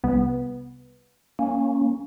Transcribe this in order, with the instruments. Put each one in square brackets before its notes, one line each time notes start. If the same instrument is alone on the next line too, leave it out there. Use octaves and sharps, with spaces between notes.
[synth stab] C2 B3
[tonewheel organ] A#3 C#4